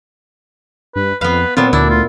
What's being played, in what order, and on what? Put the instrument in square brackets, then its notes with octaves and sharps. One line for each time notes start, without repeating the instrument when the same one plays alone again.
[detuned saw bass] G2 [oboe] B4
[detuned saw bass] F2 [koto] B3 F5 [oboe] B4
[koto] A#2 F#3 B3 [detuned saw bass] C4 [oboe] F4
[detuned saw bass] D2 [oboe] D4 [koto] E4
[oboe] F4